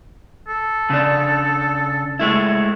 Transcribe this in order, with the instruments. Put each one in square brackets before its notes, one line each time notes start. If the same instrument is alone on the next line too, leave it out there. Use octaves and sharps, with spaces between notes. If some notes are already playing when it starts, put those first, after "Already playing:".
[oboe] A4
[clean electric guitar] C#3 D4
G#3 A3 E4